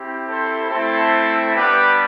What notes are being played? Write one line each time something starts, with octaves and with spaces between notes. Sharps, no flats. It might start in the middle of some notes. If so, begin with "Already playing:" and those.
Already playing: C4 E4 G4
A4 C5
A3 C4 E4 A4 C5
G3 B3 D4 G4 B4